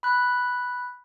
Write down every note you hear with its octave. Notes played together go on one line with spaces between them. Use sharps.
B5 F#6